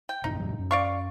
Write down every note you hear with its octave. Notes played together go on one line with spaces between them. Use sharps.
G5
A1 F#2 A#2 D#4
F2 A2 F#3
F#2
D5 F5 C#6